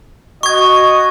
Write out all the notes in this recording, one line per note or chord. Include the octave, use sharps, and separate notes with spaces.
F#4 D#5 C#6 G#6